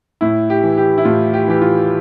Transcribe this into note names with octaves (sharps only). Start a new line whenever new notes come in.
A2 E4
G4
E3
G4
E4
A2 F4
G4
E3 G4
F4